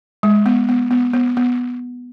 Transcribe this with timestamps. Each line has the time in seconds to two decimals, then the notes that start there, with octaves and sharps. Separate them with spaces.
0.23 G#3
0.46 B3
0.69 B3
0.91 B3
1.13 B3
1.37 B3